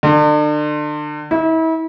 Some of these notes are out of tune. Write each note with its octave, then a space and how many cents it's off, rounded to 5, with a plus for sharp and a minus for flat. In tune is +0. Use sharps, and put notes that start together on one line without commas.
D3 +35
E4 -35